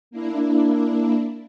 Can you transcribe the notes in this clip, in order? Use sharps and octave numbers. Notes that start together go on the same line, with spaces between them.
A#3 D4 E4